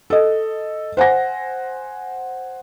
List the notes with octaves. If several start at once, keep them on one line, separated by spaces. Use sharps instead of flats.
A4 D#5
C5 F#5 G#5 A#6